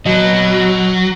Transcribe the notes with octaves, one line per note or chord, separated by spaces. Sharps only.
F#3 F#4 D#5